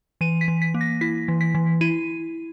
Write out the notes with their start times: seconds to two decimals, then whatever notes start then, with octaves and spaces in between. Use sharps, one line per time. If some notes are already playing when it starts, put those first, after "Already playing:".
0.21 E3 D#7
0.41 B6
0.48 E3
0.62 B6
0.74 A#3
0.81 A#6
1.01 E4 B6
1.28 E3
1.41 B6
1.55 E3
1.81 E4 D#7